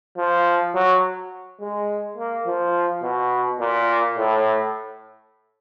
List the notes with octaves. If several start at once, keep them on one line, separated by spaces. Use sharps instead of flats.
F3
F#3
G#3
A#3
F3
B2
A#2
A2